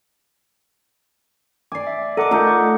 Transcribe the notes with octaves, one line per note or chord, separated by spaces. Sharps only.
D5 G#5 D6 C7
E5
A4 A#4 D#5 F#5 D6
A3 D#4 F4 A4 G6
F#5